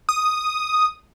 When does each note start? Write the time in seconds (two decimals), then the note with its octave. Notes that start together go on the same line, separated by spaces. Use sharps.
0.09 D#6